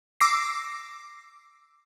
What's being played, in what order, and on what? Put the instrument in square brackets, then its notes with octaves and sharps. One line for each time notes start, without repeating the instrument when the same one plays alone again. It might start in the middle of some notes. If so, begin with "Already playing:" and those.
[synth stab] D6 E6 A#6 C7